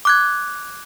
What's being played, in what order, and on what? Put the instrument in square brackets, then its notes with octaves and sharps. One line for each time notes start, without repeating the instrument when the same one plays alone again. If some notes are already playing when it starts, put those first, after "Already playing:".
[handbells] D6 F#6 G#6